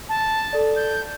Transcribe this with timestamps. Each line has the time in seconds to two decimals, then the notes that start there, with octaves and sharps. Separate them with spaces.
0.09 A5
0.53 A4 D5
0.76 G6